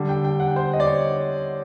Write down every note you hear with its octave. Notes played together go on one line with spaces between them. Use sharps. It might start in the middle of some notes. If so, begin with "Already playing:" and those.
Already playing: D3 G3
G5
G5
F#5
C5
D#5
D5
C#5